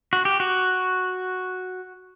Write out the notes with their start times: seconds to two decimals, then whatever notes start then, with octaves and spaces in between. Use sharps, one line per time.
0.13 F#4
0.25 G4
0.40 F#4